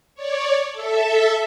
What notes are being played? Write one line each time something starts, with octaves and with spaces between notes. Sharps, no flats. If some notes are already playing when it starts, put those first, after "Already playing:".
C#5 D5
A4 E5